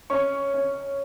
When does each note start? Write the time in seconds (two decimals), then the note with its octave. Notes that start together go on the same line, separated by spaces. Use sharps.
0.10 C#4 C#6
0.54 C#4